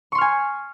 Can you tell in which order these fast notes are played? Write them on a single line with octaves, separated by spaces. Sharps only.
C#6 C6 F6 G#5